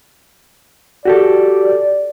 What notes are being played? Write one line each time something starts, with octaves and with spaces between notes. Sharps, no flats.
F#4 G4 A4 D5